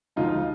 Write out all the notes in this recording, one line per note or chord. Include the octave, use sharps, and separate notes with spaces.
D2 D3 F3 G#3 D#4 F4